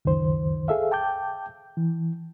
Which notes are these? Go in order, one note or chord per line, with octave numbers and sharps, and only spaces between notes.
C#2 F#2 D#3 C5
G#4 A4 E5 F5
G5 A5 D6 G6
E3